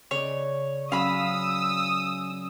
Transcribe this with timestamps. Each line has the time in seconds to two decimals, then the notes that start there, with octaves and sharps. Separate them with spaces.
0.11 C#3 C#5 D5
0.92 F#3 C#4 F5 B5 D#6 E6